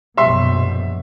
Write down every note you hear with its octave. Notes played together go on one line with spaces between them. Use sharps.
A#1 F#2 B2 E5 C6